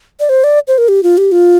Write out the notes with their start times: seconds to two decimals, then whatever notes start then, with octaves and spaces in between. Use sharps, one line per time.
0.20 D5
0.29 C5
0.44 D5
0.68 C5
0.78 A#4
0.88 G4
1.03 F4
1.18 G4
1.32 F4